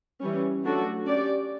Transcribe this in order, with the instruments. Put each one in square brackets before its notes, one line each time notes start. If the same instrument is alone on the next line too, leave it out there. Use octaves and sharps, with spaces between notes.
[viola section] E3 G3 C#4
F#3 A3 D4 F#4 A4
C#4 G4 D5